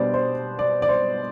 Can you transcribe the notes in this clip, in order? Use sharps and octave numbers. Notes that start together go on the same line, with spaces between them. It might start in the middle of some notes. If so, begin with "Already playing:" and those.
Already playing: B2 G3 B3 D4 C5 D5
C5
D5
D5
C5